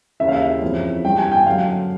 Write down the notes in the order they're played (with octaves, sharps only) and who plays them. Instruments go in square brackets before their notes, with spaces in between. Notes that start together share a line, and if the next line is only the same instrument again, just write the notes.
[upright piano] D#2 C#3 E3 E5
F5
E5
F2 C#3 E3
G2 E3 G5
G#5
G5
F#2 D3 F5